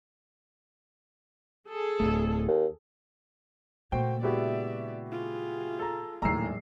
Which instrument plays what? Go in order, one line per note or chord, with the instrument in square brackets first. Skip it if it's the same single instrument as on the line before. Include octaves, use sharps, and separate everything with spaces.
[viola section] G#4 A4
[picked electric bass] D1 D#2 A3
[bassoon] D#2
[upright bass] A#2 C#3 [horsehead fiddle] A3 A#3 [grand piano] F#4 C5 G5
[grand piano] G#3 B3 E4 [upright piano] F#4 G4 [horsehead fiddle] D5 E5
[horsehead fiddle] F4 G#4
[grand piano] A4 A#5
[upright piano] A#1 E6 C7 [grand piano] D#2 A2 A#5 [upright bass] F#3 G#3